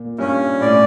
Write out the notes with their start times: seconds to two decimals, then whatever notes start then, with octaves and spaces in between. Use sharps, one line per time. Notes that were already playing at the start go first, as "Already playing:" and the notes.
Already playing: A#2
0.19 G2 C#4
0.61 A2 D5